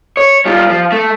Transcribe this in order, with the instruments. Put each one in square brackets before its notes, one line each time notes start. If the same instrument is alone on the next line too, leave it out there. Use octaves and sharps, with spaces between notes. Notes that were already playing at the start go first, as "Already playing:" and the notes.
[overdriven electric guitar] C#5
G3 F4
F3
A3